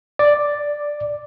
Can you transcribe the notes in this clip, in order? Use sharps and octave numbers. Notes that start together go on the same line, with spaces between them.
D5